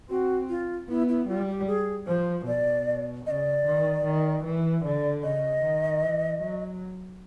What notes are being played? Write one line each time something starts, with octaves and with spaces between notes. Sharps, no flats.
C4 F#4
F4
B3 E4
E4
G3 F4
G4
G#4
F3 C5
B2 D5
C#3 D5 D#5
D#3
D#3
E3
D3 D5
C#3 D#5
D#3
E3
F#3